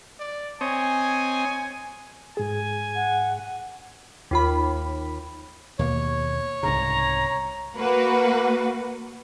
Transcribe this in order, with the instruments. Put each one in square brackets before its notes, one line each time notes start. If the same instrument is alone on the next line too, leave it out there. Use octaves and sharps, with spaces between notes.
[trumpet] D5
[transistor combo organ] C4 C#5 D#5 [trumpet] G#5
[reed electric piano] G#2 G#4 [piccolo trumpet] G#5
[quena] F#5
[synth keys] D#2 F4 B5
[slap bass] D#2 B2 A#3 [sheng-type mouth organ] C#5
[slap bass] C2 G#2 C#3 [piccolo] A#5
[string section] A#3 F#4 B4